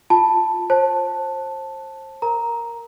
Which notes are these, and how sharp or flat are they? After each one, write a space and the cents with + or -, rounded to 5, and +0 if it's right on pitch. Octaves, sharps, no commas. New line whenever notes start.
F4 +15 A5 +0
C5 +30 A5 +0
A#4 +0 A#5 +0